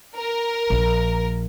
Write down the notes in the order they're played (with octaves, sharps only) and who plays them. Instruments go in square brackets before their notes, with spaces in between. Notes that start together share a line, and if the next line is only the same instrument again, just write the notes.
[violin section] A#4
[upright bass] A#1